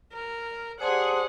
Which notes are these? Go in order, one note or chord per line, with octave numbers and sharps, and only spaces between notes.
A#4
G4 G#4 C5 D5 F#5 A5 C6